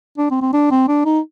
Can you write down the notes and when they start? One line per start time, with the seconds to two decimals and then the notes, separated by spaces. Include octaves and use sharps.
0.18 D4
0.31 C4
0.41 C4
0.53 D4
0.71 C4
0.88 D4
1.05 D#4